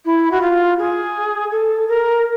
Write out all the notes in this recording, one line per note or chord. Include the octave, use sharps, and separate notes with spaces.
E4
F#4
F4
G#4
A4
A#4